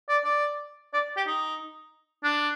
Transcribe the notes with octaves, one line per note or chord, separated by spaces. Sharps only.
D5
D5
D5
G4
D#4
D4